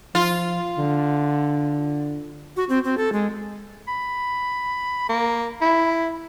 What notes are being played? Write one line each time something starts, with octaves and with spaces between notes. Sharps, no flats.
F3 F4
D3
F#4
C4
C4
A4
G#3
B5
A#3
E4